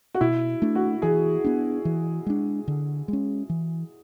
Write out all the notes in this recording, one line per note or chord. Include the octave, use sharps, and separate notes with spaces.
F#4
B2 E4
A3 D4
F#4
E3 G#4
B3 D4
E3
G#3 D4
D3
G#3 C#4
E3